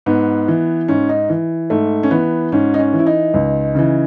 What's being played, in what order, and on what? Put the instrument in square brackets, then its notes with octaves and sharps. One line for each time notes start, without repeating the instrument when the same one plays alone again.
[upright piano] G#2 B3
E3
G#2 C#4
D#4
E3
G#2 A3
C#4
E3 B3
G#2 C#4
D#4
C#4
E3
E4
D#4
C#2
C#3 E3